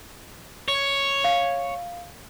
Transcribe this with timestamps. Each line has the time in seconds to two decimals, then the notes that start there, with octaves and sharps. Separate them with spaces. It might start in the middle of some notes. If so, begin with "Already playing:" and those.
0.68 C#5
1.24 F5